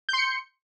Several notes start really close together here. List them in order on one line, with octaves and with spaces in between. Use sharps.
G6 C6 C#7